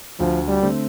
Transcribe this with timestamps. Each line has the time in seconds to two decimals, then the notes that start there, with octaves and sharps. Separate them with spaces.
0.19 D2 F3
0.48 G3
0.62 D3 A3 C4